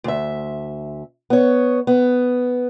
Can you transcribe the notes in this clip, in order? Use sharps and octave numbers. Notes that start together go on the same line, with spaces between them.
D2 E5
B3 C#5
B3